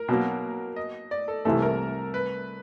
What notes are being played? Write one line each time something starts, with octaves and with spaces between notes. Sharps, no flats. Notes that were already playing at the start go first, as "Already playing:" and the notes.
Already playing: A#4
B2 F#3 A#3
D#5
D5
A4
C2 C3 E3 A3 A4
A#4
B4